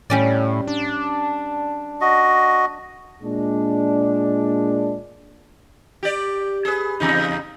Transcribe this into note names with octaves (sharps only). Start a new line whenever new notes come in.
A2 G3 C#4 D5
D4
F#4 D#5
A#2 G#3 D4
G4 D5
G#4 B4
E2 C#3 D#4